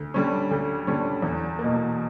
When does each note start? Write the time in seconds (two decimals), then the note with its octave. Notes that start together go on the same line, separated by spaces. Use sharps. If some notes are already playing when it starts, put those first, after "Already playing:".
Already playing: D2
0.14 D3 G3 C#4
0.51 D2
0.87 D3 G3 C#4
1.22 E2
1.59 A#3
1.64 B2